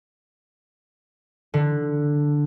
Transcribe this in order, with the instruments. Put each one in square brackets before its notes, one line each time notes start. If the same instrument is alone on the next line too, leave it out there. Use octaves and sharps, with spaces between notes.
[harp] D3